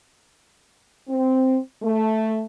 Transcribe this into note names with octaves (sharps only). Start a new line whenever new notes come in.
C4
A3